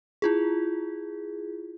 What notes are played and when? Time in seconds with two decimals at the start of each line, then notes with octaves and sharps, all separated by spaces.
0.22 E4 F4 G#4